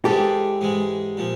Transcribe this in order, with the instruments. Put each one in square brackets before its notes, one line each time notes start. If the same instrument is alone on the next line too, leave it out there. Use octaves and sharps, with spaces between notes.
[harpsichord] G#2 E3 G#3 [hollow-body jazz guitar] G4 A4
[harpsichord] G#2 E3 G#3
A#2 F3